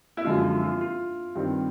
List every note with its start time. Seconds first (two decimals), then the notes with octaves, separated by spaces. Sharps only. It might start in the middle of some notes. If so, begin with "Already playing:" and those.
0.17 E4
0.25 F#2 D3 F3 G#3 F4
0.36 E4
0.44 F4
0.62 F4
0.81 F4
1.35 G2 D#3 G3 C4